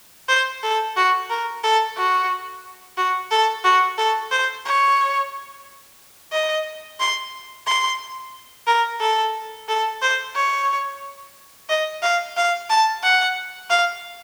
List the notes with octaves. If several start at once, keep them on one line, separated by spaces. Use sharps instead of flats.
C5
A4
F#4
A#4
A4
F#4
F#4
A4
F#4
A4
C5
C#5
D#5
C6
C6
A#4
A4
A4
C5
C#5
D#5
F5
F5
A5
F#5
F5